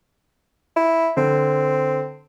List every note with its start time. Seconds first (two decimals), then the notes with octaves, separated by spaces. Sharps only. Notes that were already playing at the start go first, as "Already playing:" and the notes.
0.76 E4
1.17 D3 C4